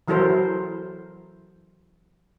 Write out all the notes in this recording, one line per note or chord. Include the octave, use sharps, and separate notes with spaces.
E3 F#3 E4 A4 A#4 C5